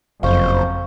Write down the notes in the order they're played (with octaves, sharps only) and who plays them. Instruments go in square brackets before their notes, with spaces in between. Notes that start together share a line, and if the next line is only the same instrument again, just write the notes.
[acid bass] F#1 [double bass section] F2 [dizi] C5 [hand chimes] F5 C#6